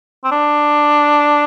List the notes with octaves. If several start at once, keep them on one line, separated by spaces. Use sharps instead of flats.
C4
D4